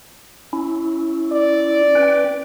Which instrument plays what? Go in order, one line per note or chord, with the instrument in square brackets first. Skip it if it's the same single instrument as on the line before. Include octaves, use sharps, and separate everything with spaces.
[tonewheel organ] C#4 E4
[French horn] D5
[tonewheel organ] C#4 B4 G5